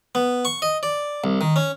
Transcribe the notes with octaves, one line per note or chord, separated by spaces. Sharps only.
B3
C#6
D#5
D5
C2
D#3
C#4